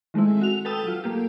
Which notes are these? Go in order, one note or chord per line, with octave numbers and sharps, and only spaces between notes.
D#3 G#3 A3 C4 E4
F#4 F7
A4 B4 G5 A5 D#6 E6
F#3 F4
A3 A#3 F4 G4